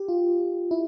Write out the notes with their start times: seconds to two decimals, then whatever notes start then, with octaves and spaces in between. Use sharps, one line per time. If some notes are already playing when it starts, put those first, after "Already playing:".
Already playing: G4
0.08 F4
0.71 E4